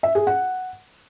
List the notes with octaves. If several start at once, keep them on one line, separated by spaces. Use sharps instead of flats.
E5
G#4
F#5